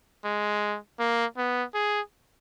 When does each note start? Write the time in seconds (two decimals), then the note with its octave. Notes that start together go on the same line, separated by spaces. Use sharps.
0.24 G#3
0.99 A#3
1.37 B3
1.74 G#4